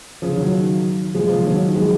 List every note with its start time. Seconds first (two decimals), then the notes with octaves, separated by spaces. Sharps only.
0.22 C#3 F3
0.37 D#3 F#3
1.15 F3 G#3
1.29 C#3 F3
1.45 D#3 F#3
1.75 F3 G#3